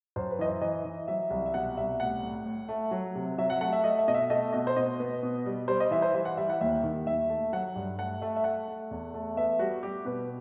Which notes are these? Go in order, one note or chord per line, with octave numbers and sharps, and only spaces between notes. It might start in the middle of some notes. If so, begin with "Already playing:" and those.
F#2 C5
B4
E3 D#5
C5
E3 D#5
E3
F#3 E5
C2
E5
B2 F#5
C2 E5
A2 F#5
A2
A2
A3
F#3
C3
F#3 E5
F#5
A3 F#5
E5
A3 D#5
E5
B2 D#5
E5
A3 D#5
B2 D#5
C5
B2 D#5
B3
B2
G3
G3 C5
D#5
E3 E5
C5
G3 E5
F#5
G3 E5
F#5
D#2 E5
D#3
D#2 E5
A3
F#3 F#5
G2
A3 F#5
A3 E5
E5
A3 F#5
A3
E2
A3
B3 E5
G3 F#4
G3 G4
B2 B4